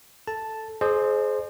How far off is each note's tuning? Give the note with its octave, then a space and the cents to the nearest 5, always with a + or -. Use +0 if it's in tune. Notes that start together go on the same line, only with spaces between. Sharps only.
A4 +0 A5 +0
G#4 +30 C5 +0 D#5 -45